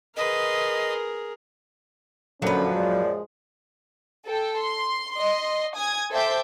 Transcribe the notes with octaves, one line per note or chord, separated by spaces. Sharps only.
G#4 A#4 B4 D#5 C6
F#2 A#2 D3 F3 F#3 C#4 B4
G#3 D5
A4 G5
C6
D#5 C6
G#5 D#6 G#6
A4 C5 E5 G5 D6 G6